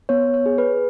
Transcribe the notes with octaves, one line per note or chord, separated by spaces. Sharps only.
B3 C#5
C#5
G#4
B4